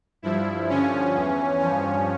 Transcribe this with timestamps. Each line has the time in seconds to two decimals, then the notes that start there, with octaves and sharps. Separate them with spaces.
0.22 G2 F3 E4
0.69 G2 D3 F3 C#4
1.15 E2 E3
1.60 G2 F3 C#4